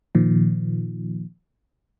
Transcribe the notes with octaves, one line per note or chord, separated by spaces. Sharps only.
A#2 D#3 F3